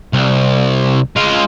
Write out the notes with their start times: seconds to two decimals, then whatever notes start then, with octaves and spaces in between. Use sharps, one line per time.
0.13 C2
1.16 G#3 F4